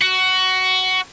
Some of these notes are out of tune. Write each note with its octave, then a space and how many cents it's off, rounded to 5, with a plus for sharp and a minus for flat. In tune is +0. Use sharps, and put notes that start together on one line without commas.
F#4 +15